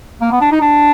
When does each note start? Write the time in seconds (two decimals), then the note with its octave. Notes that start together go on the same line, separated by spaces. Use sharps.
0.21 A#3
0.31 B3
0.41 D4
0.52 D#4
0.61 D4